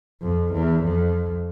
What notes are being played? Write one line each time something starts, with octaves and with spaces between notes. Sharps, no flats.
F2
E2
F2